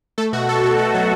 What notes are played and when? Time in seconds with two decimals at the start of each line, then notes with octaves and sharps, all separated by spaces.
0.18 A3 A4
0.33 B2 F#4
0.48 A3 A4
0.64 B2 F#4
0.78 A3 A4
0.94 F#3 F#4